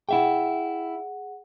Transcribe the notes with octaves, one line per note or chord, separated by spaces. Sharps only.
E4 G#4 E5 F#5 G5